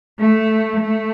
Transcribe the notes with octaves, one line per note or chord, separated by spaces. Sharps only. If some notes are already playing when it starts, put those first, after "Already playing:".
A3
A3